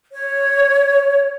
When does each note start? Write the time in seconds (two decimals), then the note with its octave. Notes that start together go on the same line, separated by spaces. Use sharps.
0.13 C#5